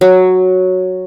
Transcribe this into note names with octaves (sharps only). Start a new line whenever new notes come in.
F#3